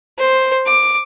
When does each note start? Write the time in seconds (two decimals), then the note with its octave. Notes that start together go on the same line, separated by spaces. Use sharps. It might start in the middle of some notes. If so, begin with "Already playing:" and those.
0.18 C5
0.66 D6